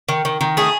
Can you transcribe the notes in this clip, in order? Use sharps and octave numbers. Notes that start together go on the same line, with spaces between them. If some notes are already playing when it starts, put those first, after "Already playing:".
D#3
D#3
D#3
A3 G#4